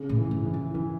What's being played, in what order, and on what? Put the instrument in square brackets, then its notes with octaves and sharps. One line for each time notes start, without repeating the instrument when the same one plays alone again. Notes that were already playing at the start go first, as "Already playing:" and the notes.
Already playing: [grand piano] C#3
[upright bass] A2
[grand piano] E3
[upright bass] G#2
[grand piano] E3
[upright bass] F#2
[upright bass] D#3 [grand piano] E3